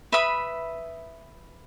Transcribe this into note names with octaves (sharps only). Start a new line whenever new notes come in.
B4 E5 B5 D#6